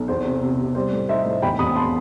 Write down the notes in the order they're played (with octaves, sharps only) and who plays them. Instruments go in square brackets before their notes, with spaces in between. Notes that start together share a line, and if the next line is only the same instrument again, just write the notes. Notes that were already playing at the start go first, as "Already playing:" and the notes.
Already playing: [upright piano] B1
E2 C5
C3
C3
C3
G3 C5
A2
D#4 C5 E5
A2
E1 G5 B5
E1 B5 D#6
A5 C6